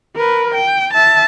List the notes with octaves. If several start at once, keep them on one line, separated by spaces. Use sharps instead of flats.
A#4 B4
G5
E5 A5